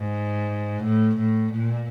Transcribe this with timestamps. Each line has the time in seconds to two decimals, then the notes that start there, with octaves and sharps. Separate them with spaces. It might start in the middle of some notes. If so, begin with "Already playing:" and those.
Already playing: G#2
0.84 A2
1.18 A2
1.53 A#2